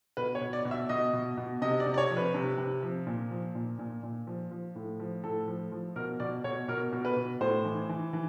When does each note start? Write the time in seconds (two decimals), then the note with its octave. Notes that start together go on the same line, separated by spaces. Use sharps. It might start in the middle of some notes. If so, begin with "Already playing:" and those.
0.17 B2 B4
0.35 C#5
0.41 B2
0.53 D5
0.65 B2
0.71 E5
0.89 B2 D#5
1.13 B2
1.37 B2
1.62 C3 D#5
1.80 D5
1.86 C3
1.94 D5
1.98 C#5
2.10 F3
2.17 B4
2.34 C3
2.58 C3
2.83 F3
3.07 A#2
3.31 F3
3.55 A#2
3.79 A#2
4.03 A#2
4.27 F3
4.51 F3
4.75 A2
5.00 F3
5.24 A2 A4
5.48 F3
5.72 F3
5.96 B2 A#4
6.20 B2 D5
6.44 B2 C#5
6.68 B2 A#4
6.92 B2
7.05 B4
7.16 B2
7.41 A2 C5
7.65 E3
7.89 E3
8.13 E3